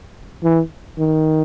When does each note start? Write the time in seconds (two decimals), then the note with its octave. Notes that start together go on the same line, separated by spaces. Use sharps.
0.43 E3
0.99 D#3